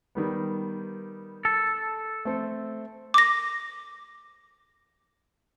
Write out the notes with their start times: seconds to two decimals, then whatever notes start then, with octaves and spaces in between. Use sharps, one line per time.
0.15 D#3 G3 B3
1.45 A4
2.25 A3 C4
3.14 D6 A#6